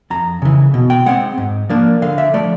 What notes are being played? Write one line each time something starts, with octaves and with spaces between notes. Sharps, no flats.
F2 A#5
C#3 E3
B2
G5
G#3 C4 F#5
G#2
F3 A#3 D4
D3 F5
E5
F3 A3 D5